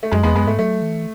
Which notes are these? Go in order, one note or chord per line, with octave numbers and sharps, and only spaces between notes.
A3
F#2 G#3
E2 G#3 B3
F#2 G#3 B3
G#2 A3
F#3 A3
E3